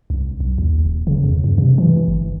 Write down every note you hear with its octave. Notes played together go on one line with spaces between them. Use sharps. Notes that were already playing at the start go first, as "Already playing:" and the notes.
C2
B1
D#2
D#1
C#3
E2
G2
C3
E3
G1